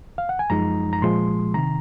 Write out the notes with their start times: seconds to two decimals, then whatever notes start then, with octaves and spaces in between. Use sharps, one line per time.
0.18 F5
0.29 F#5
0.39 G#5
0.50 F#2 F3 G#3 D#4 A#5
0.93 A#5
1.02 A#2 F3 G#3 C6
1.54 C3 D#3 A#5